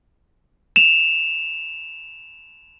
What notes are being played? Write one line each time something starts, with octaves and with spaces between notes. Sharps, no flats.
E7 F7